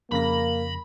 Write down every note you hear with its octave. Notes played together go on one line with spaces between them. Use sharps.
F2 C#3 A#3 B5 A#6